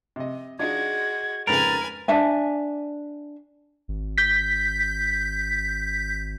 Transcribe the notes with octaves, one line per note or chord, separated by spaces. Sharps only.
C3 D#5
G#3 D4 D#4 F4 F#4 G#6
F2 G#2 C#3 A#4 B4 G#5 A6
D4 E5 G#5
G#1
G6 B6